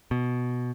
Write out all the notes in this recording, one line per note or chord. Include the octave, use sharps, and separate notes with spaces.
B2